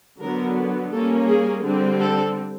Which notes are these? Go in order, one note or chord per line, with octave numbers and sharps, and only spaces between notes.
D3 F#3 B3 A#4
G3 A#3 C#4 A4
G#4
D3 G3 C4
A4